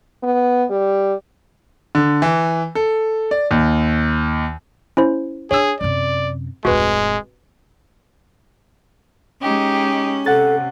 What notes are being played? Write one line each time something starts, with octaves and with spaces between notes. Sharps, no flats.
B3
G3
D3
E3
A4
D5
D#2
C#4 E4 C5
D4 G#4 C#5 E6
F#2 C3 D5
D1 F2 G#3 F#4 B4
G#3 C#4 D#4 G4
C3 A4 F#5 A6